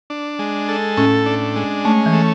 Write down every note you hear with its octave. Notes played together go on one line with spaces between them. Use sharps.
D4
G#3
A4
A2 C#4
D4
G#3
A3 C#4
E3
A3